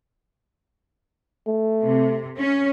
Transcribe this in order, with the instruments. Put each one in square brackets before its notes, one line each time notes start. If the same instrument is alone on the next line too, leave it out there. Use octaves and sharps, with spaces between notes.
[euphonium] A3
[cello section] C3
C#4